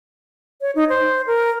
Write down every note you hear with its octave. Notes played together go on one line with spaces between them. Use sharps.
C#5
D#4
C5
A#4